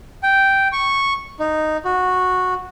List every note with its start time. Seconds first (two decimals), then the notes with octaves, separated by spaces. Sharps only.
0.23 G5
0.72 C#6
1.39 D#4
1.85 F#4